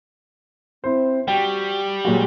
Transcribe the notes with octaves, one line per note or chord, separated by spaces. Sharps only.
C4 E4 C5
G3 F#4 G5
A#2 F#3 G#3 F#4